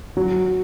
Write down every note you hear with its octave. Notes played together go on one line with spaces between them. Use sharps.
F#3